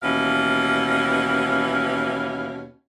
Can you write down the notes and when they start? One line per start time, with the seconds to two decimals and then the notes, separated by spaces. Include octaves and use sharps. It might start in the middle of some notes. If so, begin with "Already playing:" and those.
0.03 D#2 B2 E3 C#4 F5